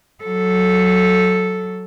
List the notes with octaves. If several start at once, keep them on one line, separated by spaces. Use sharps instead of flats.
F#3 A4